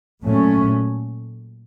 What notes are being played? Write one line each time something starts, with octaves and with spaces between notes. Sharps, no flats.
A#2 F#3 A3 C#4